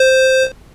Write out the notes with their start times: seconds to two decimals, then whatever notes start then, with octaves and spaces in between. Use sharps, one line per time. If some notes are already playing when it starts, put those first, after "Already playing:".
Already playing: C5